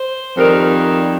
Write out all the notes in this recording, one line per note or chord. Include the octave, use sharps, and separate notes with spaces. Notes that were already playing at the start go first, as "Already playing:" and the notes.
Already playing: C5
F2 D#3 G3 A#4